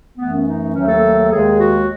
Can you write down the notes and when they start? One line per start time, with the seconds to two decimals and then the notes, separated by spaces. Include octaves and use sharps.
0.17 F#2 E3 A3 B3
0.32 C#4
0.46 D#4
0.74 D#2 D#3 F#3 A3 C#4
0.88 A4
1.31 D#2 D#3 G#3 G#4
1.59 F#4